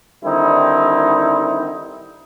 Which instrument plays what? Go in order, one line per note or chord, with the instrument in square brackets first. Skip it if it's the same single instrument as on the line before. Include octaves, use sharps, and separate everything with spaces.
[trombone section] D3 D#3 G3 C4 D#4 E4